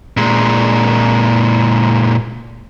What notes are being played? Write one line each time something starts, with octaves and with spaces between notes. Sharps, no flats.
A#2 G#3